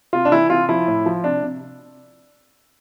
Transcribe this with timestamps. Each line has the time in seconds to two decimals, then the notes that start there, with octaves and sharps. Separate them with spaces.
0.13 C3 F4
0.25 D4
0.32 E3 E4
0.50 C3 F4
0.69 F3 E4
0.88 A2
1.06 F3
1.24 C3 D4
1.43 C3